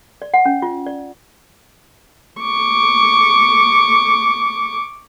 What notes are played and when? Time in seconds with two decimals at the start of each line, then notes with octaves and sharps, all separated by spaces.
0.22 D5
0.34 F#5
0.45 C#4
0.62 F4
0.86 D5
2.41 C#6 D6